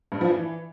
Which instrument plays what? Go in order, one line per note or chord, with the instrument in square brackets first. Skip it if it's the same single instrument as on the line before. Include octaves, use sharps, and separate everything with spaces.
[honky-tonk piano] G2
F3
E3